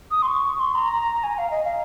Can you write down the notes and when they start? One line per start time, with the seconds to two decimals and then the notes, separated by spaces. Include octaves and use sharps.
0.11 D#6
0.22 C6
0.28 C#6
0.60 C6
0.75 A#5
1.23 G#5
1.38 F5
1.51 D#5
1.65 F5